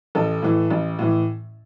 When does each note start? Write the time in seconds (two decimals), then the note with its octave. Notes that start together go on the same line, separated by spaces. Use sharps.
0.15 A1 A4
0.42 A2 E3
0.70 A1
0.99 A2 E3